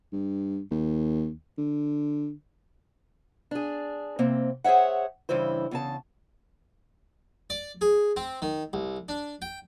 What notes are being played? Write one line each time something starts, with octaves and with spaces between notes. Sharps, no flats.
G2
D#2
D3
D4 G#4
C3 A#3 C4
G#4 C5 C#5 E5 F#5
G2 C#3 E3 E4 C5
E2 C#3 A5
D5
G#4
C4
D#3
C2
D4
G5